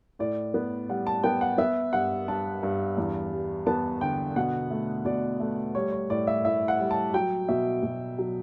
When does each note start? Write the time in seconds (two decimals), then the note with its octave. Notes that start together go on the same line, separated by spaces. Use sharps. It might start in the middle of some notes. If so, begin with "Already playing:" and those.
0.19 A2 D5
0.54 B3
0.89 G3 F#5
1.07 A5
1.24 B3 G5
1.41 F#5
1.58 B3 E5
1.93 G2 F#5
2.28 G2 A5
2.63 G2
2.97 E2
3.32 G3
3.67 B3 A5
4.01 D3 G5
4.36 B2 F#5
4.71 A3
5.05 B2 D5
5.40 A3
5.75 G3 C#5
5.92 C#5
6.10 A2 D5
6.27 E5
6.45 A2 E5
6.68 F#5
6.79 G3
6.91 A5
7.14 F#3 G5
7.48 B2 E5
7.83 B2
8.18 F#3